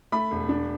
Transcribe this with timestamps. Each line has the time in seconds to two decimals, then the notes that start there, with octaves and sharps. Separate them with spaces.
0.12 A3 B5
0.31 E1
0.49 D4